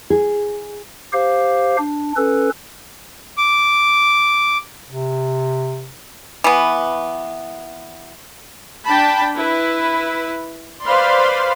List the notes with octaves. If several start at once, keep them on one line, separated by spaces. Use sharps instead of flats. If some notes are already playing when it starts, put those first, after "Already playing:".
G#4
G4 C5 F5
D4
C#4 A4 B4
D6
C3
E3 B3
D4 G5 A5 B5
E4 B4
B4 C5 D5 F5 B5 C6